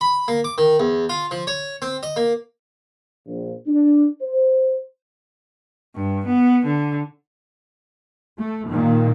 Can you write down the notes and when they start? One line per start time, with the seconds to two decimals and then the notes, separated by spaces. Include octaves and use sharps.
0.01 B5
0.28 A#3
0.44 D6
0.58 D#3
0.79 E2
1.09 F4
1.31 F3
1.47 C#5
1.82 C4
2.03 D#5
2.16 A#3
3.26 A#1
3.66 D4
4.21 C5
5.95 G2
6.25 B3
6.63 D3
8.39 A3
8.69 A#2 D#3